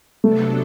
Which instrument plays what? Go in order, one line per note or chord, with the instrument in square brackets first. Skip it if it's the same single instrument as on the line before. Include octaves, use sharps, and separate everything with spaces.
[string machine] C3 F#3 B3 D4 A4 [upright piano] A3